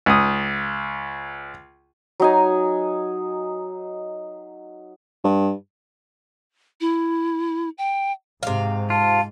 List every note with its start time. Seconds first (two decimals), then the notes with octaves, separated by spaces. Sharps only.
0.06 C#2 D#6
2.20 F#3 D#4 G#5
5.24 G2
6.81 E4
7.78 G5
8.43 G#2 C3 F5
8.90 F4 A5